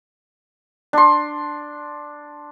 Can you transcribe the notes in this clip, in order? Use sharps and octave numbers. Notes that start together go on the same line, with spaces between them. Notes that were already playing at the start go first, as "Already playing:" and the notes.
D4 C6